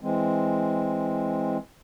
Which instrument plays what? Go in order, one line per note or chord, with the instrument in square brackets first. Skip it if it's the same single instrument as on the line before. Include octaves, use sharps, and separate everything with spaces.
[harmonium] E3 G#3 C4